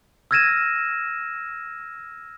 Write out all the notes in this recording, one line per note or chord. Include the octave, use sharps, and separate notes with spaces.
E6 F6 G#6 A#6 D#7 E7